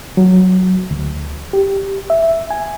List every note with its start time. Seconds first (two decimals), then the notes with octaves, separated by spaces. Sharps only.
0.17 F#3
0.91 D2
1.53 G4
2.10 E5
2.51 G#5